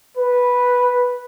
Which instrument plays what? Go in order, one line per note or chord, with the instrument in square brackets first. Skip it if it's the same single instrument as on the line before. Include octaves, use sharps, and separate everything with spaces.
[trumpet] B4